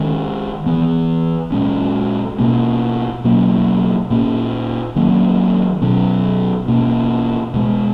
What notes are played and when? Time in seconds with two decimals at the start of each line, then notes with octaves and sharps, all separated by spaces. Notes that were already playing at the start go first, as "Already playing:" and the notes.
Already playing: D#3 G#3 C#4
0.66 E3 B3
1.52 A#2 G#3 C#4
2.39 B2 A#3 C#4
3.24 B2 F#3 A#3 C#4
4.10 A#2 A#3 C#4
4.96 D#3 F#3 A#3 C#4
5.82 B2 F#3 C#4
6.68 B2 A#3 C#4
7.54 B2 G#3 B3